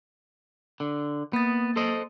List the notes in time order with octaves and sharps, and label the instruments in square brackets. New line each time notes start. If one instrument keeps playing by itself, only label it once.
[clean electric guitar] D3
[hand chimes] A#3 A6 [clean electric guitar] B3
[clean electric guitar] A4 C5 D#5